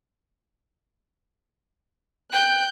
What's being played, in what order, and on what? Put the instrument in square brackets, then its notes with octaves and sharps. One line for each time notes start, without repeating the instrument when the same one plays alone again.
[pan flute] G5 [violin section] F#6 G6